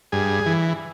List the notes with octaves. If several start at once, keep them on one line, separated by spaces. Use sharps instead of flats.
G2 G#4
E3